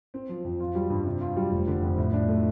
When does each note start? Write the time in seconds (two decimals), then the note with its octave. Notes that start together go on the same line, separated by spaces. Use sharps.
0.14 C4
0.29 F3
0.45 F2
0.60 F4
0.75 G3
0.90 G2
1.06 C3
1.21 F4
1.37 G3
1.52 F1
1.67 D3
1.82 F2
1.98 A2
2.13 D4
2.28 A3